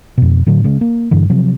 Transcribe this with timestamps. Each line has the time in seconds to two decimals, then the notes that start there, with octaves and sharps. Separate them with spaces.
0.17 F2 B2
0.46 A2 D3 F#3 D4
0.64 C#3 G#3 C#4
0.81 A#3
1.11 G2 D3 E3
1.30 C3 F3 F#3